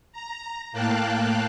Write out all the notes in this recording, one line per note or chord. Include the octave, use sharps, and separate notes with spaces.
A#5
A2 A#3 F5 G5 A5 F#6